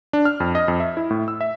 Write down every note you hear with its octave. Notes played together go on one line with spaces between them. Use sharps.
D4
F6
F2
D#5
F2
E5
E4
A2
E6
E5